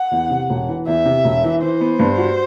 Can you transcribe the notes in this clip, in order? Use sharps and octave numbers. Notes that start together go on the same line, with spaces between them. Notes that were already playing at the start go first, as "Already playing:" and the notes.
Already playing: F#5
E2
C3
E1
E3
E2 E5
C3
E1
E3
E3 C5
B3
G2
F#4